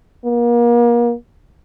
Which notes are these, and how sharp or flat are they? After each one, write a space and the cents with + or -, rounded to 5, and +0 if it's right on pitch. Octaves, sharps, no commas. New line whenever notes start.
A#3 +35